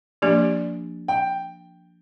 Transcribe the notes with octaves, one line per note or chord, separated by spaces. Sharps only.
F3 A#3 D4 G4 D5
G5